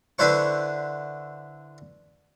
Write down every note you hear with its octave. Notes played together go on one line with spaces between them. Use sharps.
D3 D4 E4 B4 C5 C#6